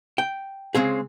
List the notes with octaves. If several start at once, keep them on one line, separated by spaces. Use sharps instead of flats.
G5
C#3 G#3 C4 G#4